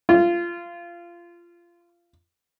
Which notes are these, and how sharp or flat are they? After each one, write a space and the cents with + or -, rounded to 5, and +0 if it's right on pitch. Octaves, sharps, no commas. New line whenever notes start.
F4 -20